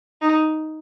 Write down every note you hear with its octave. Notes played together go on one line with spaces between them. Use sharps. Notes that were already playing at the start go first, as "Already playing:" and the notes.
D#4